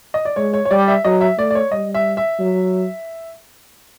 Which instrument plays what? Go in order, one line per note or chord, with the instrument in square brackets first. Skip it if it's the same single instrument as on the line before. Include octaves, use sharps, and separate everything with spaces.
[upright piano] D#5
D5
[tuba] G#3 [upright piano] C#5
[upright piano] C#5
C#5
[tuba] G3 [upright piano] D5
[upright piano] E5
[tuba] F#3 [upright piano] D#5
[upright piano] E5
[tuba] A3 [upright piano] D5
[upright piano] D5
C#5
[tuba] G3 [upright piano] D#5
[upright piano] E5
E5
[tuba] F#3